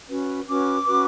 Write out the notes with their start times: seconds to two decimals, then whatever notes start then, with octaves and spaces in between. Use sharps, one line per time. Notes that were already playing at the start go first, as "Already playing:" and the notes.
0.10 C#4 F#4 B4
0.47 C#4 F#4 B4 D6
0.86 C#4 F#4 B4